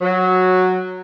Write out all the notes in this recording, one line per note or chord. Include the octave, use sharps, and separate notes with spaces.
F#3